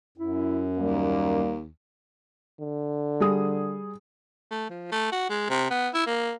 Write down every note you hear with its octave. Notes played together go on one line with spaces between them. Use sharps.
F#2 E4
D#2 G3 A#3
D3
G3 G#4 D#6
A3
F3
A3
F#4
G#3
C3
B3
E4
A#3